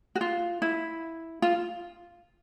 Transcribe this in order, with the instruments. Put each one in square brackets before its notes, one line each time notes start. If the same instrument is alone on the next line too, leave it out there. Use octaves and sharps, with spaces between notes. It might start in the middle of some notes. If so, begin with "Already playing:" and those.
[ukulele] F#4
F4
E4
F4